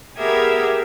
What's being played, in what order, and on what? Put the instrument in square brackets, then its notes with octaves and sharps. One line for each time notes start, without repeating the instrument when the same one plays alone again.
[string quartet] B3 G4 G#4 A#4 E5 G#6